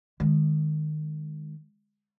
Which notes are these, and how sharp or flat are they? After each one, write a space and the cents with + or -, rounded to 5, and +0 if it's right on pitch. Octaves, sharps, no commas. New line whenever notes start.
D#3 -25 G#3 +0